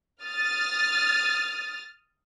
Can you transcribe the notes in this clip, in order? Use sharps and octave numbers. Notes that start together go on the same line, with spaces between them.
D#6 F6 A6